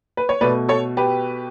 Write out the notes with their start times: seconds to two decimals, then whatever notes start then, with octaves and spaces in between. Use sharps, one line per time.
0.17 B4
0.29 C#5
0.41 B2 A3 B4 D5
0.69 A4 C#5
0.97 G4 B4